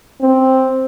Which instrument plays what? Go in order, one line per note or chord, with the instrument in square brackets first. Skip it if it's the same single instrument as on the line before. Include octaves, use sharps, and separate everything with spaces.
[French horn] C4